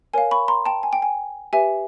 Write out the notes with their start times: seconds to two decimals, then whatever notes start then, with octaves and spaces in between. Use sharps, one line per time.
0.14 A#4 C#5 F5 G#5
0.31 B5 C#6
0.48 A#5 C6
0.66 G5 A5
0.83 G#5
0.93 G5
1.02 G#5
1.53 G4 B4 E5 G#5